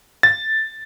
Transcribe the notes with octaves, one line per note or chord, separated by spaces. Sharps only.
A6